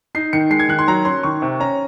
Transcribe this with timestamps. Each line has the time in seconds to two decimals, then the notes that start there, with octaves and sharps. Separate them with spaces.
0.15 D#4 C7
0.33 D#3 C#7
0.51 G#3 C7
0.60 G#6
0.69 D#3 F#6
0.79 C6
0.88 F#3 A#5
1.05 C#4 C6
1.23 D#3 C#6
1.42 C3
1.60 C#4 A#5